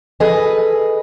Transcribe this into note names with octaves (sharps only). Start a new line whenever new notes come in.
G#4 A4 B4 D#5 G#5